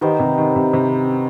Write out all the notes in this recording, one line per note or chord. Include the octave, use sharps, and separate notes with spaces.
D#3 B3 D#4 G4 C5
C3
D#3
C3
C3